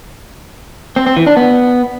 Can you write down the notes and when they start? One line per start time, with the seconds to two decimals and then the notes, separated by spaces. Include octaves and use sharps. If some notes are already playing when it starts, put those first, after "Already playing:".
0.96 C4
1.06 C4
1.17 E3
1.27 D4
1.37 B3